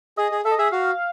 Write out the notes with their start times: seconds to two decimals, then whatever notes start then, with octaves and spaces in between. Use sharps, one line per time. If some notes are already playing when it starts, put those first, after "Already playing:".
0.17 G#4 D#5
0.31 G#4
0.45 A4 E5
0.52 D#5
0.59 G#4 E5
0.72 F#4 F5